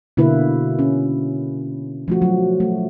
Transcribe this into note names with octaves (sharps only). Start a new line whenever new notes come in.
B2 D3 A#3 E4 B4
C#4
F3 A3 F#4
F#3
A3